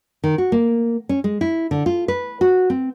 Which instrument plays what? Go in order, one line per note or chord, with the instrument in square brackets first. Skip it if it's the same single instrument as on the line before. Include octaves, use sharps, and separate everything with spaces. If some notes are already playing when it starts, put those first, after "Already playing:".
[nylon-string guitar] D#3
F#4
A#3
C#4
G#3
E4
D3
F4
B4
F#4
C4